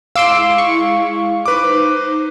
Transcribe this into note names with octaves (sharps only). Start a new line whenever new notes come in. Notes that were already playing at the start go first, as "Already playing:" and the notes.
G#3 E4 F5 C6 D6 E6 D7
C#6
D#4 B4 C5 D6